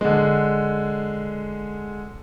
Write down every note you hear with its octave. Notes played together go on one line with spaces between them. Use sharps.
D3 G#3